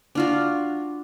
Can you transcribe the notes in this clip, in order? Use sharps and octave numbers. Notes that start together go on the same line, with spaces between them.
D4 F4 F#4